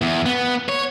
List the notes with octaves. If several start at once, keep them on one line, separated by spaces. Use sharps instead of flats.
E2
B3
C#5